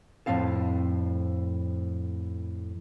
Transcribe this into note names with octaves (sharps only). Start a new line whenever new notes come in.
F2 A2 C4 F5 A5